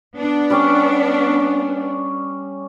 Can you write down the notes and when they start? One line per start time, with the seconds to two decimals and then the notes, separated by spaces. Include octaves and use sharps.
0.15 B3 D4
0.50 G3 C#4 D5